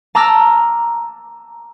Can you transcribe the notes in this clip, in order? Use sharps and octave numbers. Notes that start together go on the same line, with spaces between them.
A5 A#5 D6 E6 F6 A#6